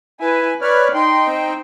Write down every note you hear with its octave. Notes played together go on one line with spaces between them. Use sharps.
E4 B4 G#5
B4 C#5 D5 F6
D#4 G5 C6
C4